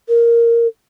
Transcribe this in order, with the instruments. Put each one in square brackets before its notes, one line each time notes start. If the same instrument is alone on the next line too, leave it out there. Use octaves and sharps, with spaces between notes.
[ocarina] A#4